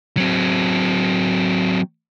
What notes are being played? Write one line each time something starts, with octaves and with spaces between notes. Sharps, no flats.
F#3 C4